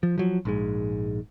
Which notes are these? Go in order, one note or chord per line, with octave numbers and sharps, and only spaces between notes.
F3
F3 F#3
A#1 G#2 G#3